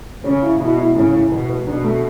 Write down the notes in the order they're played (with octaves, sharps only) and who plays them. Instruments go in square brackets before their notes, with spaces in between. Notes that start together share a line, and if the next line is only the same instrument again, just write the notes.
[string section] C#3 [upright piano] C#4
[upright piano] E4
[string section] B2 [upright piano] E4
[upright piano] E4
[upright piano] A2 [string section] C#3
[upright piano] A2
[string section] B2 [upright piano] B3
[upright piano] B3
[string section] B2 [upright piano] D4
[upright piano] A3